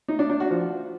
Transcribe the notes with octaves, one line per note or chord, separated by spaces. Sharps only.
D#4
D4
D4
F#4
F3